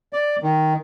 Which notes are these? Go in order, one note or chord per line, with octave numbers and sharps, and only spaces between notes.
D5
D#3